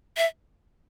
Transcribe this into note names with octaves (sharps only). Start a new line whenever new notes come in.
E5